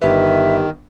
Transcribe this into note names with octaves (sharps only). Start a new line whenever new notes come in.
G1 D#3 G4 B4 E5